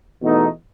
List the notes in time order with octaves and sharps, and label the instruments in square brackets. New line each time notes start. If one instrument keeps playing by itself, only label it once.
[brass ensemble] E2 B2 A3 D#4